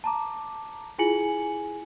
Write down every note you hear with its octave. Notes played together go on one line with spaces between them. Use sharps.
A5 A#5 D6
E4 F4 G#4 G#5 C#7 F#7